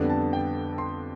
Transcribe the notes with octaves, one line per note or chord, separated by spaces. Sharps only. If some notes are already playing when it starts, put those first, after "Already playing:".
Already playing: F2 D3 G3 B3 D4
A5
G5
C6